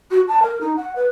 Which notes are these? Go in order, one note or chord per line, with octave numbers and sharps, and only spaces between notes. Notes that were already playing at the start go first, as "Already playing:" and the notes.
F#4
A5
A#4
D#4
F#5
B4